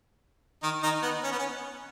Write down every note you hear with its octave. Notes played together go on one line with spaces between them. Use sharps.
D#3 D#4
D#3 D#4
B3
C#4
B3
C#4